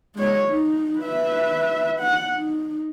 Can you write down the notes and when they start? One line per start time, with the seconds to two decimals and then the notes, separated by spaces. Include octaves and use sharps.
0.15 G#3 C#5
0.49 D#4
0.99 B4 E5
2.00 F#5
2.34 D#4